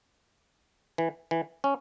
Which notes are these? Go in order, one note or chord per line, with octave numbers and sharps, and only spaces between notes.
E3
E3
C#4